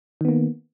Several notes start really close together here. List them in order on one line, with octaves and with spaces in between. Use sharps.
D#3 B3 A#3